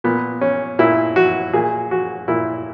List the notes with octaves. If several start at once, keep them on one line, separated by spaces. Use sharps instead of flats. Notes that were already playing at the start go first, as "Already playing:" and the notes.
A#2 B3
C#4
A#2 E4
F#4
A#2 G#4
F#4
A#2 E4